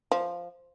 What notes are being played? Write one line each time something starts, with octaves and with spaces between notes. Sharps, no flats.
F3